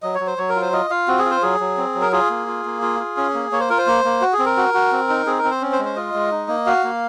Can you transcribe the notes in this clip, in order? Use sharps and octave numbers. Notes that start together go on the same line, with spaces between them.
F#3 D#5
C#5
F#3
C5
F#3 C#5
A#4
F4
C5
F4 D#5
F4 F5
C4 F#4
G#4
F4
C5
F#3 G#4
F#3
C4
F#3
A#4
F4 G#4
A#3
F4
A#3
F4
F4
C#4
A#3
A#3 C#5
C5
F4 A#4
C5
A#3
A#3
F#4
G#4
C4
A#4
F#4
F#4
C4
D#4
C4 G#4
A#4
C4
C5
C#4
C5
G#3
C5
F4 D#5
G#3
D#4
A#3
F#4 F5
A#3